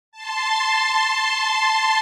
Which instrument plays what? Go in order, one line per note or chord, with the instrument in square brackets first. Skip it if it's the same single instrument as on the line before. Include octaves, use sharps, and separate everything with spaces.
[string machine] A5 C6